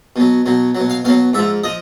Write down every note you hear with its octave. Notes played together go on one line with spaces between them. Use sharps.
B2 F#3
B2 F#3
B2 F#3
F5
B2 F#3 F5
G#2 F3 E5
F3 D#5